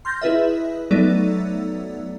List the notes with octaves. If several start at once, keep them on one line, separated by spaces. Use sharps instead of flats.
C6 F6 G6 A6 A#6
E4 G#4 B4 D#5 E5
F#3 A3 B3 D#4 A4 D5